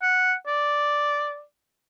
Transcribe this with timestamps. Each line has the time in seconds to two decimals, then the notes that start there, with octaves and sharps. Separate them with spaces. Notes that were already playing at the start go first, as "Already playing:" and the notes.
0.02 F#5
0.47 D5